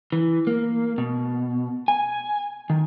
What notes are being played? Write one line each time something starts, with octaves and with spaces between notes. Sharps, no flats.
E3
A#3
B2
G#5
D#3